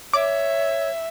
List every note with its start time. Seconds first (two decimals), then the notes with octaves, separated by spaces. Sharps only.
0.14 C#5 E5 D6